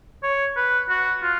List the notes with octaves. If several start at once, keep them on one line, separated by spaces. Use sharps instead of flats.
C#5
B4
F#4
F4